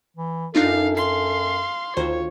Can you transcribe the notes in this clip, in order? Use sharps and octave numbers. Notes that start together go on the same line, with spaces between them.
E3
F#2 D4 D#4 F4 A4 F5
F5 C6 C7
D2 D#3 F4 C5 C#5